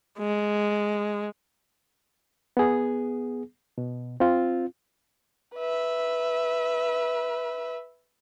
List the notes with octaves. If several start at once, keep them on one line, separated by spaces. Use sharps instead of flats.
G#3
B3 G#4
B2
C4 F4
B4 E5